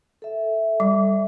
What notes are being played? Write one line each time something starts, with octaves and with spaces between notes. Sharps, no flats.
A4 E5
G3